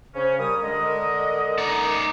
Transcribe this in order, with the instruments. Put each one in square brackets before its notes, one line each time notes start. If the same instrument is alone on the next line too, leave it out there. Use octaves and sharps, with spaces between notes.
[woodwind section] C#3 C#4 [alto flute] C5
[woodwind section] G3 D#6 [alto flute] A#4
[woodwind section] D3 G#3 D#5
[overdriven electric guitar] D#4 D5